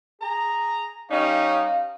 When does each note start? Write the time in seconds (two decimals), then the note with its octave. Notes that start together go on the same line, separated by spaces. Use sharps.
0.22 G#4 A#5
1.11 G3 C#4 D#4 F5